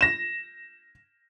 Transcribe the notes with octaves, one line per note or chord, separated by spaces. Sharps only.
A#6 E7